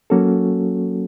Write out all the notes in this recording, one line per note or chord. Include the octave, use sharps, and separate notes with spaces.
F#3 A#3 C#4 F#4 A4